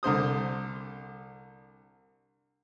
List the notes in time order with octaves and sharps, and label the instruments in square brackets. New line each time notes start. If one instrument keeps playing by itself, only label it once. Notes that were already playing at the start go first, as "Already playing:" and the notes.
[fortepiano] C2 D3 C5 D#6